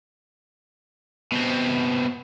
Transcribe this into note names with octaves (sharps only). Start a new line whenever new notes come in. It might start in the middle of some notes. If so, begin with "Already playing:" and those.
B2 C4